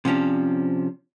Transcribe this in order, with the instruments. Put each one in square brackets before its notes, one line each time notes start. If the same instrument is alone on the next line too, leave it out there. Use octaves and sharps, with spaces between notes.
[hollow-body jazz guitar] C3 F3 C#4 D4